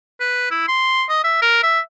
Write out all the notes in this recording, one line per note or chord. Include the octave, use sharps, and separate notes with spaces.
B4
E4
C6
D#5
E5
A#4
E5